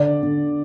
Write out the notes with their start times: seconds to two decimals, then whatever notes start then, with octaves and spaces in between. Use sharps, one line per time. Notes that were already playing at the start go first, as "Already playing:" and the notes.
Already playing: D3 D5
0.23 D3